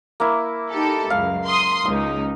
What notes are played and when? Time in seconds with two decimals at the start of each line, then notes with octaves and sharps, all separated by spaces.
0.20 A#3 E4
0.71 D#4 G4 A4
1.10 C#2 F#2 F5
1.47 C6 D#6
1.85 C#2 D#4 D#6